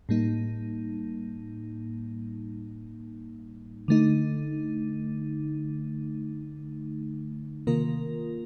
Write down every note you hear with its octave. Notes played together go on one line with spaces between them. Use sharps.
A2 G3 A#3 D#4
D3 A3 D#4
C3 D#3 A#3 F4 A#4